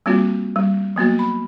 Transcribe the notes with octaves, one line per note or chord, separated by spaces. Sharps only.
G3 A#3 C4 F4 F#4
G3
F#3 A#3 B3 F#4
B5